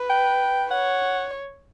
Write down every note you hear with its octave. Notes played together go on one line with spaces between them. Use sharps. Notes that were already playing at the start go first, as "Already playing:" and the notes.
Already playing: B4
G5
C#5 F#5